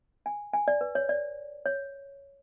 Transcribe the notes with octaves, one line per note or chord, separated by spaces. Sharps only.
G#5
G#5
D5
B4
C#5
D5
C#5